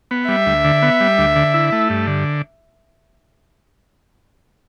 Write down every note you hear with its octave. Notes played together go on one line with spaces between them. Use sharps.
B3
G3 E5
D2
D3
B3
G3
D2
D3
E4
A3
G2
D3